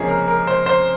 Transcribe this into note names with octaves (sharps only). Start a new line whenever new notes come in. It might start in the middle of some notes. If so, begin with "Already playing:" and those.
Already playing: C#2 C3 F3 A#3 C#4 G#4
A#4
A#4
C5
C5